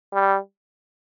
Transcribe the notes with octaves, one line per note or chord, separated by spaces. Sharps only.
G3